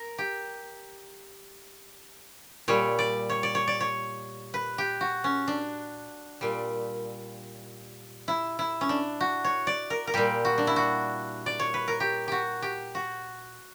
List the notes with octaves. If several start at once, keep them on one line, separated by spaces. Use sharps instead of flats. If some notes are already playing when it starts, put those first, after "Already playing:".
Already playing: A#4
G4
A#2 G3 C#5
D5
C#5
D5
C#5
D5
C#5
B4
G4
F#4
C#4
D4
A#2 G3
E4
E4
C#4
D4
F#4
C#5
D5
A#4
A#4
A#2 G3 G4
F#4
D4
E4
F#4
D5
C#5
B4
A#4
G4
F#4 G4
G4
F#4